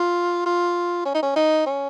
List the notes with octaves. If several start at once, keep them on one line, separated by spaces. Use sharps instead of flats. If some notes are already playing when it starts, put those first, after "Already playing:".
Already playing: F4
F4
C#4
D#4
C#4
D#4
C#4